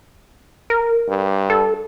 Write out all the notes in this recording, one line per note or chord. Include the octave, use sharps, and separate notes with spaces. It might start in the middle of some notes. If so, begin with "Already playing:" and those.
A#4
G2
A4